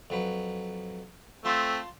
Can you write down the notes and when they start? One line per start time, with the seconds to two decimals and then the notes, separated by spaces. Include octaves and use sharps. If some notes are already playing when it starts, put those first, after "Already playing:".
0.10 F2 F#3 B4
1.45 A3 C4 F4 A5 C6